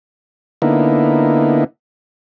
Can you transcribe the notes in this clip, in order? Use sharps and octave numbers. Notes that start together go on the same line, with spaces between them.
D3 A#3 B3 D#4 E4